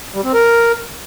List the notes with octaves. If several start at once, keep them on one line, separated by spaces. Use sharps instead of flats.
G3
C4
A#4